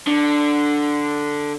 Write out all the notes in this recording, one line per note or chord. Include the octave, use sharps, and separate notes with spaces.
D3